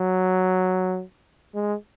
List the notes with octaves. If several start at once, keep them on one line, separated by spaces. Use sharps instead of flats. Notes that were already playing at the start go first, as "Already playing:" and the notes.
Already playing: F#3
G#3